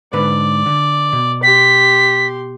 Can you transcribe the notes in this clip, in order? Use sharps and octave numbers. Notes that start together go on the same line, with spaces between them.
G#2 D3 B4 D5
D3
B2
G4 C6 B6